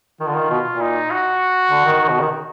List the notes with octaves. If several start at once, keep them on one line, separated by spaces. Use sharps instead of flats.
D#3 F4
D3
D#3
B2
A#2
D#4
F#4
D3
D#3
D#3
B2
D#3